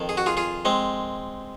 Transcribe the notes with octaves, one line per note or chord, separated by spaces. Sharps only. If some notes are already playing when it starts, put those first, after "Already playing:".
Already playing: F2 D#3
G#4
F#4
F4 G#4
F4 G#4
G#3 C4